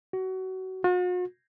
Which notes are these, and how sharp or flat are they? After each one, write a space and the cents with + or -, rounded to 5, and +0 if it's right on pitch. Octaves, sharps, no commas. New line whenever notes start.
F#4 +25
F#4 -45